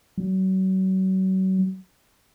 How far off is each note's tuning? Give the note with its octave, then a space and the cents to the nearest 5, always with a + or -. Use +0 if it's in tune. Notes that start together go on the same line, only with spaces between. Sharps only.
F#3 +35